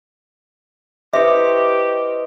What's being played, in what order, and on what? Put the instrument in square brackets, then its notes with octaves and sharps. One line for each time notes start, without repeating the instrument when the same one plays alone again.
[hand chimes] E4 B4 C#6 [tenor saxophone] G4 [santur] C5 D#5 [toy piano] E5